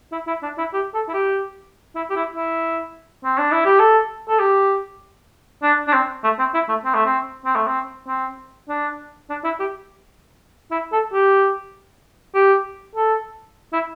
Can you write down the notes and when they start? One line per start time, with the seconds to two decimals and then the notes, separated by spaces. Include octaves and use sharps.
0.12 E4
0.27 E4
0.43 D4
0.58 E4
0.73 G4
0.94 A4
1.08 E4
1.14 G4
1.95 E4
2.10 G4
2.16 E4
2.36 E4
3.24 C4
3.38 D4
3.52 E4
3.65 G4
3.79 A4
4.29 A4
4.39 G4
5.63 D4
5.88 D4
5.93 C4
6.24 A3
6.39 C4
6.54 E4
6.69 A3
6.85 C4
6.94 A3
7.06 C4
7.46 C4
7.56 A3
7.67 C4
8.07 C4
8.69 D4
9.30 D4
9.44 E4
9.60 G4
10.71 E4
10.92 A4
11.13 G4
12.35 G4
12.95 A4
13.73 E4